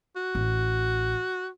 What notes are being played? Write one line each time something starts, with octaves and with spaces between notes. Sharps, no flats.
F#4
A1